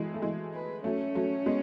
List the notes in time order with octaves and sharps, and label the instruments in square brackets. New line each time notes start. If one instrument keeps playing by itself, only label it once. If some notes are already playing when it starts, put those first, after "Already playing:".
Already playing: [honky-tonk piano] E3 F#3 G#3 A3
A3
E3 G#3
[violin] B4
[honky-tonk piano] F#3 A3 [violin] C#4
[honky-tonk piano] F#3 A3
G#3 B3